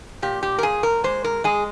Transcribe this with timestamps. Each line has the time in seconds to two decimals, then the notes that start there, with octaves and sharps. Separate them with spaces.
0.22 A#2 G4
0.43 G4
0.58 A#4
0.63 A#2 G#4
0.83 A#4
1.04 G#3 C5
1.24 A#4
1.44 G#3 G#4